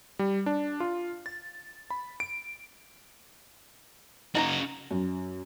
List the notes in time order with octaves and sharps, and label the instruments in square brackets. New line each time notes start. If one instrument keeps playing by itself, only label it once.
[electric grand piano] G3
D4
F4
A6
B5
D7
[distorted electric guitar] C#3 F#4 [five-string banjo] D#4 A5 A#5
[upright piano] F#2